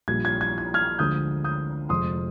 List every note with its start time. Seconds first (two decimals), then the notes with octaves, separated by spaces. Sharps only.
0.08 A#1 A#2 G3 G#6
0.25 G#6
0.41 G#6
0.58 G#6
0.74 F6 G#6
0.99 D2 D3 F3 G#3 D#6 G6
1.44 D#6 G6
1.89 F1 F2 C3 F3 G#3 C6 D#6